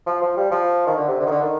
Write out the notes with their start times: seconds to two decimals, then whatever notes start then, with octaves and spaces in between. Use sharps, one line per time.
0.07 F3
0.21 F3
0.37 G3
0.51 F3
0.87 D#3
0.97 D3
1.08 C3
1.20 D3
1.26 D#3
1.31 D3
1.42 D#3